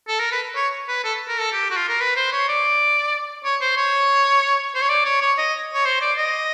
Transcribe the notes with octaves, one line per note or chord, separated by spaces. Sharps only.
A4
A#4
B4
C#5
B4
A4
A#4
A4
G4
F#4
F4
A#4
B4
C5
C#5
D5
C#5
C5
C#5
C5
C#5
D5
C#5
C#5
D#5
C#5
C5
D5
D#5